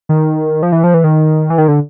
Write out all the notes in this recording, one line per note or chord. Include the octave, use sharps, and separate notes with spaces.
D#3
F3
E3
F3
E3
D#3
E3
D#3
D3